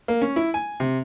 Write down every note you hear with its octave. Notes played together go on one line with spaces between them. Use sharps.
A#3
C#4
E4
G#5
C3